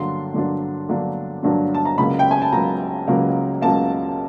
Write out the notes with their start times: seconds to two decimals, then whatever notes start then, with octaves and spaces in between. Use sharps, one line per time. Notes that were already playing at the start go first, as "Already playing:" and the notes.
Already playing: G2 D3 F#3 A#3 D4 C6
0.34 G2 D3 F#3 A#3 D4
0.89 G2 D3 F#3 A#3 D4
1.43 G2 D3 F#3 A#3 D4
1.74 A5
1.85 A#5
1.98 C#2 C#3 F#3 A#3 B5
2.19 G5
2.31 G#5
2.42 A5
2.52 C#2 C#3 F#3 A#3 A#5
3.07 C#2 C#3 F#3 A#3
3.62 C#2 C#3 F#3 A#3 A5